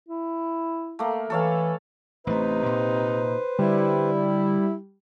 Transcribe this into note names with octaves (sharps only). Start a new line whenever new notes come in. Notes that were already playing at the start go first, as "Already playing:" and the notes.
E4
A3 A#3
E3 A4 C#5 F5
A1 C3 A3 D#4 B4 C5
A#2
D3 G3 E4